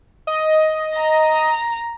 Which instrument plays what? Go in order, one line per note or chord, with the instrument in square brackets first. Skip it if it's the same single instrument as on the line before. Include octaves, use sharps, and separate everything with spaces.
[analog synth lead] D#5
[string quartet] A#5